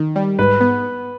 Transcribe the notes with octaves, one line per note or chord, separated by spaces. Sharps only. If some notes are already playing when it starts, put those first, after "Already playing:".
Already playing: D#3
G3
G#2 B4
B3